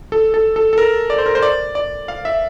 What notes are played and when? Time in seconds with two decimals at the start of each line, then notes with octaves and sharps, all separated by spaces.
0.12 A4
0.34 A4
0.56 A4
0.73 A4
0.78 A#4
1.10 D5
1.18 C5
1.26 A#4
1.35 C5
1.42 D5
1.75 D5
2.08 F5
2.25 E5